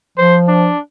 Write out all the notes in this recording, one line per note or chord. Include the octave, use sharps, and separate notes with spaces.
F3 C5
D4